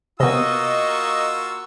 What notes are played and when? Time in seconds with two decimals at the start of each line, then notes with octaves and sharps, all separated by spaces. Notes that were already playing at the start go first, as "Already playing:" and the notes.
0.20 C3 A#3 B3 F4 F#4 D#5 C#6 E6